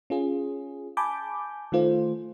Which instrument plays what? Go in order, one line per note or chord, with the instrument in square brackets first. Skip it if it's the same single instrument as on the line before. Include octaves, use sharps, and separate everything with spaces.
[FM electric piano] C#4 F4 G#4
G#5 A5 B5 D6 G6
D#3 A3 F4 C5